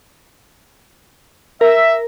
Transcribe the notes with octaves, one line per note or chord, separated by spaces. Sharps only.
A#4 E5